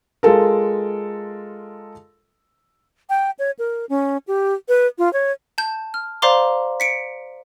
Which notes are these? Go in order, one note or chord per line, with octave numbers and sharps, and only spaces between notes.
G#3 F4 A4 A#4
G5
C#5
A#4
C#4
G4
B4
F4
C#5
A5 G6
F6
C5 D5 F5 A#5 C6 D6
B6 C#7 D7